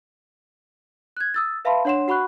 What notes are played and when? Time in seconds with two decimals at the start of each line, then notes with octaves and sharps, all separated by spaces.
1.17 F#6 G#6
1.34 D#6 E6 A6
1.65 B4 E5 F5 A5 B5 C6
1.85 D4 C#5 F#5 C6 E7
2.08 F#4 F#5 B5 C#6 F#6